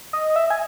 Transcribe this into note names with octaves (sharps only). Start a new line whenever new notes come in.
D#5
E5
G#5